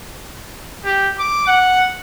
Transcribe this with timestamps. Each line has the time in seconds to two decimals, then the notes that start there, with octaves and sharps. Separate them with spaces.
0.85 G4
1.19 D6
1.47 F#5